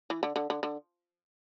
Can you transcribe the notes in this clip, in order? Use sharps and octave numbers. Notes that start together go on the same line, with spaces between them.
E3
D3
D3
D3
D3